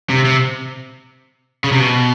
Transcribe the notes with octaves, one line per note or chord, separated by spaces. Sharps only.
C3
C3
C#3
C3
B2